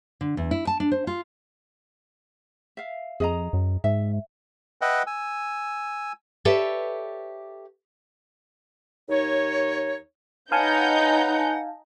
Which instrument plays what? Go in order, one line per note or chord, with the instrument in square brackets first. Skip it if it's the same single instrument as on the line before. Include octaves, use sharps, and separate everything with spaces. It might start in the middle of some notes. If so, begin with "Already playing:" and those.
[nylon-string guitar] D3
E2
E4
A5
D4
C5
F4
[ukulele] E5 F5
[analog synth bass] F2 [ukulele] G#4 D#5 A#5
[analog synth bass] F#2
[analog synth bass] G#2 [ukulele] E5
[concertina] B4 D#5 E5 F#5 G5
G#5 E6
[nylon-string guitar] G4 A4 B4 C#5 D5 E5
[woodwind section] D#2 D#4 C#5
[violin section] D#4 G6 [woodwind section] B4 C#5 F#5 [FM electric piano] F5 G#5 A5